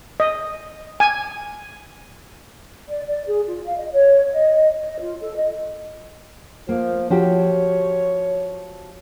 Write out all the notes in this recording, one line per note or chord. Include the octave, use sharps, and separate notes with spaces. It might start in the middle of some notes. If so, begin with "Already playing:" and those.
D#5
G#5
D5
D5
G#4
F4
F5
D#5
C#5
D#5
D#5
F4
A4
D#5
F3 A#3
F3 F#4 G4 C#5